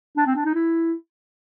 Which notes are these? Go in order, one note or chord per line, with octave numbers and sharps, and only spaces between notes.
D4
C4
D4
D#4
E4